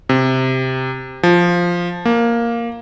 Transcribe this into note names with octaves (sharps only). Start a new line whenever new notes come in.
C3
F3
A#3